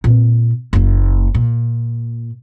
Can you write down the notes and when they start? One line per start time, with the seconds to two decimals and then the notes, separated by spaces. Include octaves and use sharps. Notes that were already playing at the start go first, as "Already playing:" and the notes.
0.04 A#2 C4
0.73 F#1 A#3
1.35 A#2